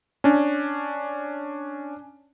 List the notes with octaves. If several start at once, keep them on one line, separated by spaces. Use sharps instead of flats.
C#4 D4